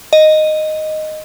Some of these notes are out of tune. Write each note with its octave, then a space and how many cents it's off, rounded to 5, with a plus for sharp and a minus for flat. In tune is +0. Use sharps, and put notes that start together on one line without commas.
D#5 -5